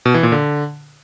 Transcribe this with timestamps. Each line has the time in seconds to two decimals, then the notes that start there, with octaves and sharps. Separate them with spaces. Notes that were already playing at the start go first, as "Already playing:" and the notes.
0.05 B2
0.14 E3
0.23 A#2
0.32 D3